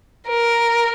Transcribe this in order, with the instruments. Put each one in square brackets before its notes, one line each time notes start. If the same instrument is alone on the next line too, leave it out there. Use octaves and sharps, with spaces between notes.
[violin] A#4